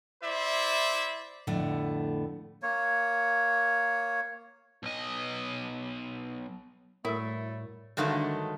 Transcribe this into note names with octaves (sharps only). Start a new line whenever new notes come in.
E4 C5 D5 E5
F2 A2 D3 A3 B3
A#3 C#5
B1 D#5
A2 F#3 G3 A3 E4 A#4 E6
G2 D3 D#3 F#3 G#3 A3